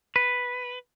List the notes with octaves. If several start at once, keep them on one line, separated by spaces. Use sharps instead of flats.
B4